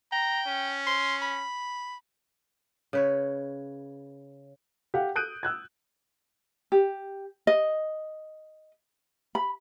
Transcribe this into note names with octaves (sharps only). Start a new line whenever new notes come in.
G5 A#5
C#4
C6
B5
C#3 B4 C#5
G4 F5 F#5
D#6 F#6 G6 D7 D#7
E6 F#6 G#6
G4
D#5
B5